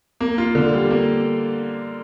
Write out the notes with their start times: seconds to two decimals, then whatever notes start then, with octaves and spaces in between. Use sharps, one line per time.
0.21 A#3
0.38 F4
0.55 D3
0.73 G3
0.91 A#3